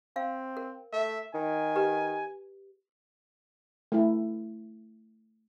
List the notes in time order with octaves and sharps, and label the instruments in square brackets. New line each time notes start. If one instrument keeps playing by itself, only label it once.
[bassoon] C4 [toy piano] F5
[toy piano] A#4
[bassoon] A3 [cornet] E5
[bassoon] D#3 [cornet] G#5
[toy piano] G4 B4
[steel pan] A3 E4